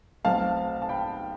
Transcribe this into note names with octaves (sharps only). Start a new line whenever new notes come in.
B1 B2 A3 C4 F5 A5
A5
G5 B5